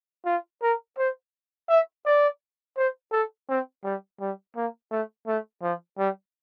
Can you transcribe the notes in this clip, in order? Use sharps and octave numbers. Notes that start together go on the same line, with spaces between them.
F4
A#4
C5
E5
D5
C5
A4
C4
G3
G3
A#3
A3
A3
F3
G3